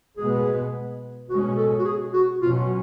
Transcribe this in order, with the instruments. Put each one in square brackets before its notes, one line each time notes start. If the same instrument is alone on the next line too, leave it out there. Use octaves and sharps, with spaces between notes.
[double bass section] B2 G#3 B3 [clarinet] G#4
[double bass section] B2 G#3 C#4 [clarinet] F#4
[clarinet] A4
F#4
G#4
F#4
[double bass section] B2 F#3 C#4 [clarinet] F4